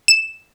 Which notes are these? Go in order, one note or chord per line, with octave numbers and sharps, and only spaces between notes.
E7